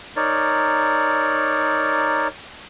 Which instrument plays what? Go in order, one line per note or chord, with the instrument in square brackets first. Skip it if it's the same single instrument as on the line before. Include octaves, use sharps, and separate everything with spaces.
[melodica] D#4 A#4 C#5 D5